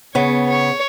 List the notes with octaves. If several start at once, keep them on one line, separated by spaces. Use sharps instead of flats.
C#3 B3 C#5
C#5